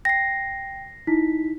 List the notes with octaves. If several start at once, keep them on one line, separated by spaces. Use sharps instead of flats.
G5 A#6 C7
D#4 E4 B6